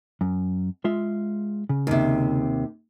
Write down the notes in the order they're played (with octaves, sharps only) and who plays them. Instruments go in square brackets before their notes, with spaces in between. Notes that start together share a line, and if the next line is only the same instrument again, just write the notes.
[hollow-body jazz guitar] F#2
G#3 F4 E5
C#3
[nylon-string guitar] D#2 C3